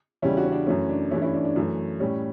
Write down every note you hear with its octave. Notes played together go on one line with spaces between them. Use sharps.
E2 C#3 G3 C#4 E4
D4 F#4
C#4
D4
F#2 E3 A3 C#4
D4
G2 E3 A3 C#4 E4
C#4 E4
D4
D4
F#2 E3 A3
A2 G3 C#4